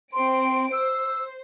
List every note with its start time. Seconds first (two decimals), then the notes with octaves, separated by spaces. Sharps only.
0.13 C4 C6 D7
0.73 C5 E6